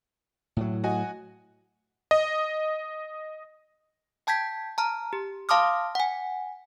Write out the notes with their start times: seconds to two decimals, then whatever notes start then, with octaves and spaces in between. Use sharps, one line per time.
0.57 A2 F#3
0.84 F#4 D#5 G#5
2.11 D#5
4.27 G5 A5 G6 G#6 B6
4.78 A5 A#5 F6
5.13 G4
5.49 F5 A5 C6 D6 D#6 F6
5.95 F#5 G#5